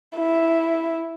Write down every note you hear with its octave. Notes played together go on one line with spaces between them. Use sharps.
E4